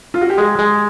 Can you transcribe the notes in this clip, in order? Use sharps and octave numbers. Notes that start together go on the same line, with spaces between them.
F4
F#4
G4
G#3 G#4
G#3